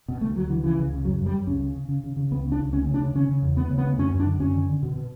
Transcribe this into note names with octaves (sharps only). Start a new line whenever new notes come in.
B2
D2 A3
D2 F#3
D3 E3
C#3 E3
C#2
C#3
F#2 F#3
F#2
G3
F#2
C#2 C#4
C#3
C#3
C#3
C#3
C#3
C#2 B3
C#3
D4
C#2
D2 C#4
C#3
D4
C#3
C#3 C#4
C#3
E2
D2 B3
C#3
B3
D2
F#2 C#4
F#2
D4
D3
F#2 C#4
D3
D3
B2
B2